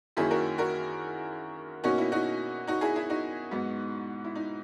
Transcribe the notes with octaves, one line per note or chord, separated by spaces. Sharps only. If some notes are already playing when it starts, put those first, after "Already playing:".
F#2 D#3 F#3 A#3 C#4 E4 G#4
F#4 A#4
F#4 A#4
B2 A#3 C#4 D#4 F#4
E4
D#4 F#4
D#4 F#4
E4 G#4
E4 G#4
D#4 F#4
G#2 F#3 B3
E4
D#4